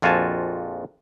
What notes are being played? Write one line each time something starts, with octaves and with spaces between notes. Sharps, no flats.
A#1 F2 F4 F#4 G#5 A5